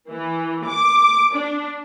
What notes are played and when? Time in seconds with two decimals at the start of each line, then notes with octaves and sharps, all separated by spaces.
0.10 E3
0.67 D6
1.35 D4